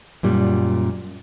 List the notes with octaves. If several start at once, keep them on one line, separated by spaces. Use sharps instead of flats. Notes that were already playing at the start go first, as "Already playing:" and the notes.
F#2 A#2 G3